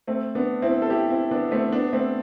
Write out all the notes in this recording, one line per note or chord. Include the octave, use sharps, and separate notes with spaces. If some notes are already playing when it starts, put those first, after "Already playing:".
A3 C4
B3 D4
C4 E4
A4
E4 G4
C4 E4
B3 D4
A3 C4
B3 D4
A3 C4